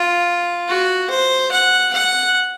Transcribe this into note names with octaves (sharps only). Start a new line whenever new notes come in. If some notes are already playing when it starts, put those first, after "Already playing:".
Already playing: F4
F#4
C5
F#5
F#5